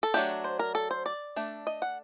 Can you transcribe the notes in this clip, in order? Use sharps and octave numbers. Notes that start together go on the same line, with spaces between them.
A4
F#3 A3 D4 G4
C5
A#4
A4
C5
D5
A3 D4
D#5
F#5